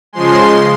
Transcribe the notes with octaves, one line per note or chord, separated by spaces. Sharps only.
C#3 F3 G#3 C6